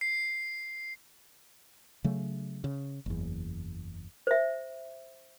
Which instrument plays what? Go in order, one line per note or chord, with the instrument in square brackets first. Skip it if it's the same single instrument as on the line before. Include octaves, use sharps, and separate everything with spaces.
[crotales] C7
[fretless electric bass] C#3 F#3 A3
C#3
F#1 E2
[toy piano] C5 E5